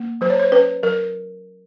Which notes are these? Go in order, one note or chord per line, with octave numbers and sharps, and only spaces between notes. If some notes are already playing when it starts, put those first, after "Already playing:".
Already playing: A#3
F#3 C5
C#5
C5
C#4 B4
F#3 A#4